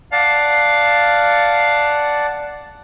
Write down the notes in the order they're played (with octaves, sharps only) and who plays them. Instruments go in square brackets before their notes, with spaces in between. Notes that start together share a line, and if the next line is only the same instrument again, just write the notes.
[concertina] D5 F#5 A5 [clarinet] F5